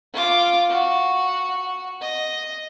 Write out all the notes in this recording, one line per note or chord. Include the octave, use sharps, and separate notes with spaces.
F4 D6
F#4
D#5